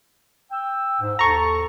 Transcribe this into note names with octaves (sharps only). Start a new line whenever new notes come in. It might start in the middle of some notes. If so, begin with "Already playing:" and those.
G5 E6
G#2
D#2 A4 A5 A#5 C#6